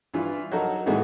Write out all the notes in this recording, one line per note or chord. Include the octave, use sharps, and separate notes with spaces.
G2 E3 F4
F#3 D#4 F#4 A4 A#4
A2 D#3 E3 G#3 A3 F#4